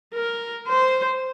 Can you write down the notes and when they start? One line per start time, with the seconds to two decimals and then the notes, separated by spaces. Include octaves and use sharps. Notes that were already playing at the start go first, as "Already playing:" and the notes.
0.14 A#4
0.67 C5